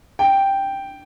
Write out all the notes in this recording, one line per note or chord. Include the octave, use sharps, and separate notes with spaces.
G5